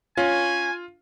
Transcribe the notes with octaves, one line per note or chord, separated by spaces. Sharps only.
C#4 F4 G#5